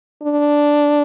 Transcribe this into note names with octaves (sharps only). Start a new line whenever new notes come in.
D4